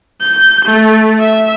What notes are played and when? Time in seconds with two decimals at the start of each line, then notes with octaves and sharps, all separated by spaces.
0.20 G6
0.65 A3
1.20 E5